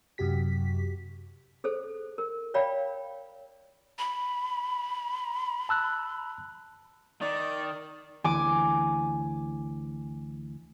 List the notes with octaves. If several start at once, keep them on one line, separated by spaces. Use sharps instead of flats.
F#2 C3 F#4 G4 B6
G#4 A4 C5
A#4
C#5 D5 F5 G5 B5
B5
A5 E6 F#6
D#3 D5
D2 E3 G#5 D6